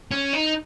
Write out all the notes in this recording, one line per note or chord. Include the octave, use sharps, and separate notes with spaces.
C#4
D#4